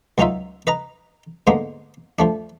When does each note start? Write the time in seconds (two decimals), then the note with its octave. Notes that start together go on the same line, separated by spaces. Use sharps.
0.18 C#2 F#3 C#4 D#4 F4 E5
0.67 B4 D#5 A#5
1.47 G#2 D3 G#3 A#3 B3
2.19 F3 A3 D4